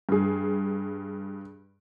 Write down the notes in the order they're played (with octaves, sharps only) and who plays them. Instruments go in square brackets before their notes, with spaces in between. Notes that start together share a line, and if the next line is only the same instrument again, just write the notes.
[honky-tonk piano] G2 G#4